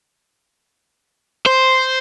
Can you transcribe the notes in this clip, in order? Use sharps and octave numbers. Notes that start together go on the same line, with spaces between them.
C5